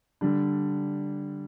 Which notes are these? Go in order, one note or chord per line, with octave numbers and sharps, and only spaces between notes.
D3 G3 D4